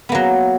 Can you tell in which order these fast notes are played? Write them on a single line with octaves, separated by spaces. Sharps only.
B3 A#3 F#3